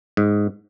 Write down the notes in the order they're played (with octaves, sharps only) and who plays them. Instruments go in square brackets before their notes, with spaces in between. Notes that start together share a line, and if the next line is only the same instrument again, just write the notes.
[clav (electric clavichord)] G#2